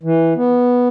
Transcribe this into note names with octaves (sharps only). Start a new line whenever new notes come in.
E3
B3